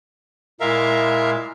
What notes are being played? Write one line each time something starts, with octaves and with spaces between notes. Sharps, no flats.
A#2 G#3 E4 A#4 E5 F5